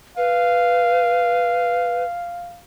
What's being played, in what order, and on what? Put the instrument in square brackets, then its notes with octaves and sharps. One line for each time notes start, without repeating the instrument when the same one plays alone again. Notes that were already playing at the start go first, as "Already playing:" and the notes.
[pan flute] B4 [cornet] F5